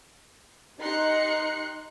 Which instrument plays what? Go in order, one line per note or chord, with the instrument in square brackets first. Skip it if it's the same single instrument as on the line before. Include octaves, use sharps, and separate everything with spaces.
[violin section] D#4 G4 C6 F#6 C#7